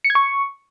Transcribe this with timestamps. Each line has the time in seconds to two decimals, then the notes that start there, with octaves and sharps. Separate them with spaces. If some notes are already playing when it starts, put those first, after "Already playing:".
0.05 C#7
0.10 G#6
0.15 C#6